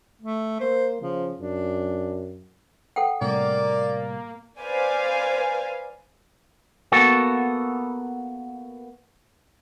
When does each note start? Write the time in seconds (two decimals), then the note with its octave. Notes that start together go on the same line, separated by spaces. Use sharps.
0.22 A3
0.61 A#3 C5
1.01 C#3 F3
1.39 F#2 D4
2.96 A4 F#5 G5
3.21 A2 C3 G3 A#3 D5
4.59 B4 C5 D5 F5 G#5
6.92 A#3 B3 F#4 A4